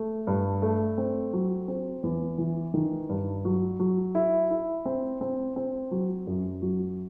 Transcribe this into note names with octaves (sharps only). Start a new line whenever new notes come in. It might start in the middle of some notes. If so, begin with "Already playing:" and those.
Already playing: A3
G2
A3
C4
F#3
C4
E2
E3
D#3
G2
F#3
F#3
E4
E4
C4
C4
C4
F#3
F#2
F#3